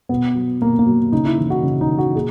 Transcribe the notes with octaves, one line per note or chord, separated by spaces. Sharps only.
B2 B3
F#3
B2 A#3
A#3
F#3
C#3 D#4
E4
E3
F#4
C#3
D#4
E3
F#4
A#2 G#4